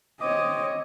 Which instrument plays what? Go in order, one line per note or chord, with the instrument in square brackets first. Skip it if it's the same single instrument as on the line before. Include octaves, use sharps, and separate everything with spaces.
[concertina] C4 D6 D#6 [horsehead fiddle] C#5 D#5